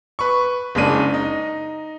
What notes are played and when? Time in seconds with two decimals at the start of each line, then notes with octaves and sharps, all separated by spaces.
0.19 B4 C#6
0.75 F#1 C#3 G#3 D4 D#7
1.14 D#4